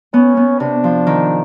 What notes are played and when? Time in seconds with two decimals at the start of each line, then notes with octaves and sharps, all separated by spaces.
0.14 B3 C#4
0.37 B3
0.60 C3 D4
0.84 F3
1.07 D#3